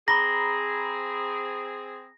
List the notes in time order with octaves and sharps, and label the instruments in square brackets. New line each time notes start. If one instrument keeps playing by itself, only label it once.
[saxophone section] C4 G#4 [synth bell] A#5 B5 [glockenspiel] A#6